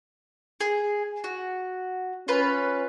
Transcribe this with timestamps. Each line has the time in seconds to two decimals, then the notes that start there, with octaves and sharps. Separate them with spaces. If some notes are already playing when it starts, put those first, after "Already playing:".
0.61 G#4
1.24 F#4
2.28 C#4 F4 B4